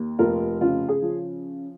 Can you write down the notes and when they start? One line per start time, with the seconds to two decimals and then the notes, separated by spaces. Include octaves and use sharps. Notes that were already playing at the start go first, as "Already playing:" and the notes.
Already playing: D#2
0.19 F1 F4 A#4
0.61 C#3 F4
0.89 G#4
1.02 F3